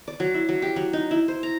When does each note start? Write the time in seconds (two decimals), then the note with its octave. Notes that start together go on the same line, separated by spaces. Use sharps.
0.08 D5
0.20 F#3
0.34 E4
0.49 F#3
0.62 G4
0.76 F#3
0.93 D#4
1.11 E4
1.28 C5
1.43 A#5